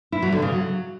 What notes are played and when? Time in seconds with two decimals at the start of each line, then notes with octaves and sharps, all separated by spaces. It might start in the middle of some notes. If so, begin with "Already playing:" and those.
0.12 E4
0.22 F#3
0.32 D3
0.42 C#3
0.52 F#3